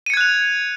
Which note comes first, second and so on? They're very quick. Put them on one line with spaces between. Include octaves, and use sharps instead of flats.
D#7 C#7 G#6 F#6 F7